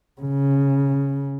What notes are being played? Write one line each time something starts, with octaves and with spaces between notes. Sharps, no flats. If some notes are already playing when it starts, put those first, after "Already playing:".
C#3